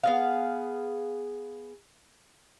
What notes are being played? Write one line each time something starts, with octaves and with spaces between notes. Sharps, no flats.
B3 G#4 F5